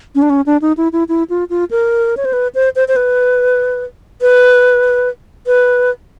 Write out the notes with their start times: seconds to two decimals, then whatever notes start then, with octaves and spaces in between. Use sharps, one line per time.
0.15 C#4
0.22 D4
0.30 C#4
0.46 D4
0.62 D#4
0.77 E4
0.93 E4
1.09 E4
1.30 F4
1.50 F4
1.71 A#4
2.17 C#5
2.25 C5
2.33 B4
2.55 C5
2.76 C5
2.88 C5
2.96 B4
4.21 B4
5.47 B4